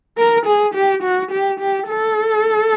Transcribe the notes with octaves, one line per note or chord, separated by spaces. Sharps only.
A#4
G#4
G4
F#4
G4
G4
A4